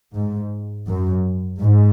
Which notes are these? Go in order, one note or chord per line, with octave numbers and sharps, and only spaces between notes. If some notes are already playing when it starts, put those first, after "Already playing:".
G#2
F#2
G#2